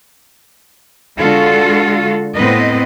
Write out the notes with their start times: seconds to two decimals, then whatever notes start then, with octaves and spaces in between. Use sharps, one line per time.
1.18 D3 G#3 F4 F#4 A4
2.35 A2 B3 C4 B4 D#5